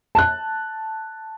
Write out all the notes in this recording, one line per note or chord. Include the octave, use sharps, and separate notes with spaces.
A5 F#6